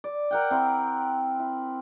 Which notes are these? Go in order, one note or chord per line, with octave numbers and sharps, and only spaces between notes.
D5
A#4 F#5 G5
C4 E4 A#4
E4